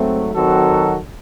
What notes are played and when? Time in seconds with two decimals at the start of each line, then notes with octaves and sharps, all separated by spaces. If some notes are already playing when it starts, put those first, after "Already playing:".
Already playing: G#2 F#3 A3 C4
0.34 D#3 F#3 C4 F#4 A4